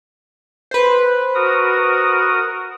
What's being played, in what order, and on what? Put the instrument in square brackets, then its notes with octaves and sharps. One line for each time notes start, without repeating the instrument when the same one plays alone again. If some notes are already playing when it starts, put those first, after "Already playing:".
[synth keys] B4 C5
[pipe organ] F#4 A#4 D#6